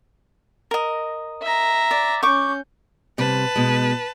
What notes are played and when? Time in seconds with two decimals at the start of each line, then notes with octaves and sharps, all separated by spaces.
0.71 A#4 D#5
1.43 E5 A#5
1.91 D5
2.23 C#4 C#6 D6 G6
3.18 C3 G3 B4 A5
3.56 B2 G#3